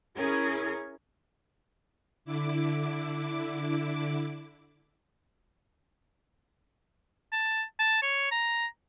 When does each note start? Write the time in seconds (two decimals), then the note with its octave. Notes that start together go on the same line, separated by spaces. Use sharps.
0.16 C#4 E4 G#4 A#4
2.25 D3 E4 D6
7.33 A5
7.79 A5
8.03 C#5
8.31 A#5